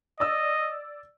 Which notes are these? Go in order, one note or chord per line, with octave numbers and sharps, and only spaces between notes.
D5 D#5 E6